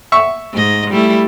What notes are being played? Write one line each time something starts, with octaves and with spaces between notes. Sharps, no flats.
E5 C#6 E6
G#2 D#5
G3 A3 E4